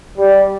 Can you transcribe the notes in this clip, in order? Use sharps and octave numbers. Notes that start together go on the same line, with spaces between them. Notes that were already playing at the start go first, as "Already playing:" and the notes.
G3